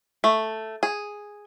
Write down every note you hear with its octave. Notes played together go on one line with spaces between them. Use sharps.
A3
G#4